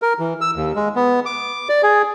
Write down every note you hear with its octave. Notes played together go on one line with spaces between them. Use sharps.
A#4
E3
E6
D#2
G#3
B3
D6
D5
G#4